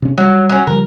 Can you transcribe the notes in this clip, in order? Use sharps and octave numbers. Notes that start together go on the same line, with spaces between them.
C3 C#4
F#3 G3
F#3 C#4
C#3 F3 G3 A#4